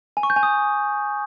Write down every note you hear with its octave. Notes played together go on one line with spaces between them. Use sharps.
G#5
C#6
G6
G#5
D#6